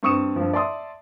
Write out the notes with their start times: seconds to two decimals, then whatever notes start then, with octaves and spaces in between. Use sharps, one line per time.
0.03 G2 C4 C#6 D#6 C#7 E7
0.36 G2 F3
0.53 D5 E5 A5 C6 D#6